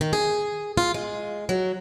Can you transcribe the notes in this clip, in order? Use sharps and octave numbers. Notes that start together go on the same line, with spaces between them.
D#3
G#4
F4
G#3
F#3